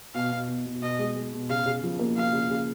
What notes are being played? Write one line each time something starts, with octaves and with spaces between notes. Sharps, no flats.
B2 F5
B2
B2
B2
B2 D#5
G#3
G#3
B2
C#3 F5
C#3
F3
A#3
F3 F5
C#3
C#3